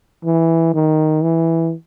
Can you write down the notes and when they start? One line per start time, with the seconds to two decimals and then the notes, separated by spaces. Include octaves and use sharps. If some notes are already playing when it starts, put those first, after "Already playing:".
0.25 E3
0.74 D#3
1.22 E3